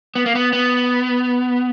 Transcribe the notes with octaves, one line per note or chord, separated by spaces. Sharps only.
B3
A#3
B3
B3